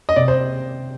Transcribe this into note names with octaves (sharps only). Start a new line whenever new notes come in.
D#5
C3 D5
C5